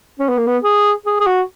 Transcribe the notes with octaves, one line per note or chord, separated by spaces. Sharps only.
C#4
B3
A#3
B3
G#4
G#4
G#4
F#4